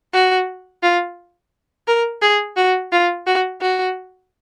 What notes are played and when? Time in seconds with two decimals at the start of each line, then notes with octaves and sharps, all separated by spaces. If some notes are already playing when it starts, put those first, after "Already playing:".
0.13 F#4
0.83 F4
1.88 A#4
2.22 G#4
2.57 F#4
2.92 F4
3.26 F#4
3.61 F#4